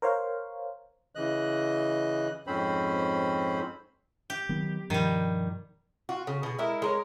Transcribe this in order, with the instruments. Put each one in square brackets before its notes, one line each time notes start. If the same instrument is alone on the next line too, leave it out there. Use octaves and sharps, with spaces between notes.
[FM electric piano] A#4 C5 C#5 F5
[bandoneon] C#3 E3 D#5 F#6
F2 G#2 C4 C#4 C5 B5
[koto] G4
[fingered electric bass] D#3 F#3 B3
[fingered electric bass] G2 B2 F3 [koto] D#3 G3
[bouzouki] F4 F#4
C#3
B2 G#4
G#3 E4 A#4
G#3 A#4 C#5